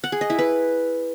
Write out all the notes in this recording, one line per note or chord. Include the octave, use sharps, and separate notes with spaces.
F#5
G#4
D#5
E4
B4